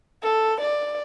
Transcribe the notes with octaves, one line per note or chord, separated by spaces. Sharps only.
A4
D5